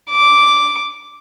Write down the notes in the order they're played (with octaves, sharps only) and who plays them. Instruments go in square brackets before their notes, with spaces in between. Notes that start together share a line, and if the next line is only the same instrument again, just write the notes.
[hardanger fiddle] D6